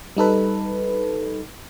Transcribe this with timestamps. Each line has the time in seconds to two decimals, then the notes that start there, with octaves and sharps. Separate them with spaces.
0.17 G3 D#4 A4 B4